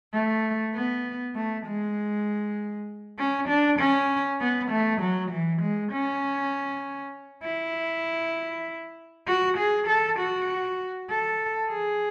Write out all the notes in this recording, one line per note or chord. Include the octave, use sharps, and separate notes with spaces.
A3
B3
A3
G#3
C#4
D4
C#4
B3
A3
F#3
E3
G#3
C#4
E4
F#4
G#4
A4
F#4
A4
G#4